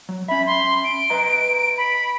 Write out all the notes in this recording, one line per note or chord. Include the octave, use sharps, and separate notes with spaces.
F#3
C#4 E5 B5
C6
D7
B4 D#5 A#5
B5